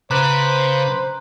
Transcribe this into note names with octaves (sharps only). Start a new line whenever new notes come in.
C#3 B4 C5 A#5 B5 D6 F#6